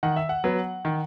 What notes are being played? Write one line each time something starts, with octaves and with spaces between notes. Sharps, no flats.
D#3 F#5
E5
F#5
F#3 B3
D#3